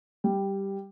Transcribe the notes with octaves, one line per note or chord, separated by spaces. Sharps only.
G3